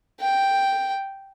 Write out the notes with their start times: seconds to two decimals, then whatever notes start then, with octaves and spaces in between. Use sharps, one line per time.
0.21 G5